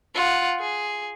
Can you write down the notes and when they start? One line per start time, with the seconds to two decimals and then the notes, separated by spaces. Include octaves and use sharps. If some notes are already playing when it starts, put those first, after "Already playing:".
0.15 F4 F#5
0.60 G#4